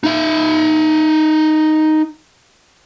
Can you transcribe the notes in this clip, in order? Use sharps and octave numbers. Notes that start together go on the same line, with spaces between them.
D#4 E5